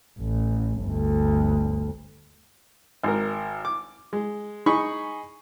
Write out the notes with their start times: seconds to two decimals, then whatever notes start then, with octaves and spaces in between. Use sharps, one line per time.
0.20 A1
0.83 G1 D2
3.04 G#1 A#4
3.65 D6
4.13 G#3
4.66 D#4 G#4 B5 C#6